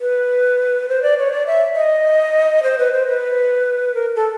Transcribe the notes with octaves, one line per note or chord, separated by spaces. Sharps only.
B4
C5
D5
C#5
D5
E5
D#5
C5
B4
C5
B4
A#4
A4